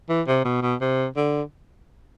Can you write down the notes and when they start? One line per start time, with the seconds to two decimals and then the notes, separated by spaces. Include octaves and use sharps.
0.09 E3
0.27 C3
0.45 B2
0.62 B2
0.81 C3
1.17 D3